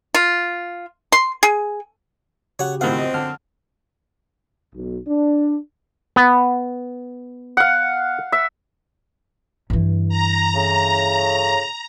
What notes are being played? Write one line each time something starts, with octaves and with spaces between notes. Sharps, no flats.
F4
C6
G#4
C#3 F#4 G4 C#5 F#5
F#2 A2 D#3 F3 C4 F5 F#5
D#5
D3 F6
B1
D4
B3
F5 F#5
E5
G2 E3
A#5
A2 C#3